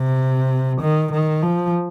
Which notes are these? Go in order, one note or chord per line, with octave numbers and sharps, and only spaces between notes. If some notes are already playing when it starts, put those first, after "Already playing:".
Already playing: C3
D#3
D#3
F3